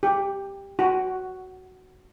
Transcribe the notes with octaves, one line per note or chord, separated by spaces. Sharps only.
G4
F#4